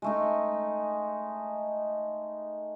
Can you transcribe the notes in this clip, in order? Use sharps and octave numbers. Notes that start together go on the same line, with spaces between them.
G#3 A3 D#4